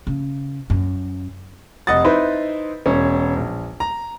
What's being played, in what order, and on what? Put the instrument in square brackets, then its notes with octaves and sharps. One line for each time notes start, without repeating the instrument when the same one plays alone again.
[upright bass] C#3
F#2
[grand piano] F1 D#5 F#5 D#6 A6
D#4 E4 B4 C5
E1 C#4
A#1
A#5